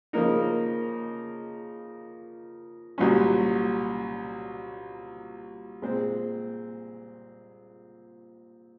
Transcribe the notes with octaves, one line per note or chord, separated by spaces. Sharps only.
C#3 F3 A#3 D#4 A#4
C2 A#2 F#3 C#4
A#2 G#3 C4